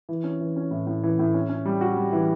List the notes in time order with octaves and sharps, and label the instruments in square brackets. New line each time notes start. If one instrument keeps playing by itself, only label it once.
[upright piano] E3
C#4
E3
C#4
A2
A2
E3
A2
C#4
C#4
G3
F#4
G3
E3